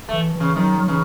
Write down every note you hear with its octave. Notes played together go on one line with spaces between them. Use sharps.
E3 A3
C#3 E3
D#3 F#3
F#3
C#3 E3